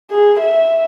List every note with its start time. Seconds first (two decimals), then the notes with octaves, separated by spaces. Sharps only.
0.11 G#4
0.40 E5